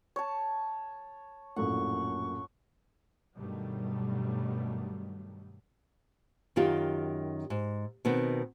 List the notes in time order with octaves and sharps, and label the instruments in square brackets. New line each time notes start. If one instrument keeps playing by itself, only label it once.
[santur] C#5 A5
[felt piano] A#1 F#2 A2 [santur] F#5 [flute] C#6
[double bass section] G2 B2 D#3 F#3 G3 A3
[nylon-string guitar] F#2 D#3 F4 G4
G#2
B2 D#3 B3 C4